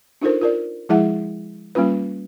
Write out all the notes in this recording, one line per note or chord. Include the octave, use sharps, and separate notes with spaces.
D4 D#4 F4 A4 A#4 C5
F4 A#4 D5
F3 G#3 E4 G#4 E5 F#5
G3 A#3 C#4 F4 B4